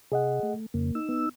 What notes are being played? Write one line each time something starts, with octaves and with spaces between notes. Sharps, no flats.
C3 G#4 D#5 F#5
A3
F2 C#3 A#3
D#4 E6
B3